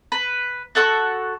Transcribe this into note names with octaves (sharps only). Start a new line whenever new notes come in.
B4
F#4 A4 F#5 C#6